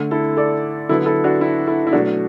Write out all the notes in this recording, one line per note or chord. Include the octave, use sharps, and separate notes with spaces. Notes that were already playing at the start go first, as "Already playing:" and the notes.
Already playing: D3 A3
E4 A4
A4 D5
D3 F#3 B3 E4 A4
E4 A4
D4 F#4
E4
E4 A4
E4
B2 F#3 A3 D4 F#4